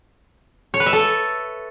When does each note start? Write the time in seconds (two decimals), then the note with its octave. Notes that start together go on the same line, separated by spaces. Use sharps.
0.74 C#5
0.80 B4
0.86 E5
0.93 A4